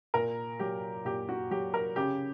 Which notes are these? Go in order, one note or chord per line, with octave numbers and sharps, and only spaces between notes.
A#2 A#4
F#3 G4
A#2 G4
F#4
F#3 G4
A#4
C#3 G4